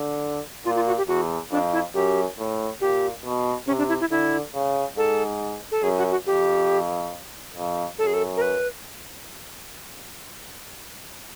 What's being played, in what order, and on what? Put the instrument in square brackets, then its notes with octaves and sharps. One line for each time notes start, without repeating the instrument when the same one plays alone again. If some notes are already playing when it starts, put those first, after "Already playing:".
Already playing: [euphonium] D3
[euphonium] A#2 [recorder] F4
[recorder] F4
F#4
G4
[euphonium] E2 [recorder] F#4
[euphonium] F2 [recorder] D4
[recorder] E4
[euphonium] F#2 [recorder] G4
[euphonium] A2
[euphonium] A#2 [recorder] G4
[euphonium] B2
[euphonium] C3 [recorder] C#4
[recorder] D4
E4
E4
[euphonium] D3 [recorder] E4
[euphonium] C#3
[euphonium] G#2 [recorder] A4
[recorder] A4
[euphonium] F#2 [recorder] G#4
[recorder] F#4
F#4
[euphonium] F2 [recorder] G4
[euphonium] F2
[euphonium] F#2 [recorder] A4
[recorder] G#4
A4
A#4
B4